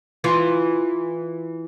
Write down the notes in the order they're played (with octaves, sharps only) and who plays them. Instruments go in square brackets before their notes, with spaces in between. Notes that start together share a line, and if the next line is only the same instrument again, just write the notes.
[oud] E3 F4